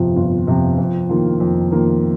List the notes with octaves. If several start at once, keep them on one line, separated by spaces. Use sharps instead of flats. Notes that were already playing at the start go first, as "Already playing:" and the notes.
Already playing: G1 F2 C3 F3
G1
F2 C3 F3
F2
D#3 A#3 F4
F2
D#3 A#3 F4